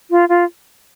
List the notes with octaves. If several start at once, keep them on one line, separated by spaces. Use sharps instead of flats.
F4
F4